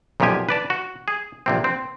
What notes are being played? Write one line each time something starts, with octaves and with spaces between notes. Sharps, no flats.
B1 F#2 A#2 F3 G4 G#5
B4 D5 A5
F#4
G#4
A#1 C3 C4
C4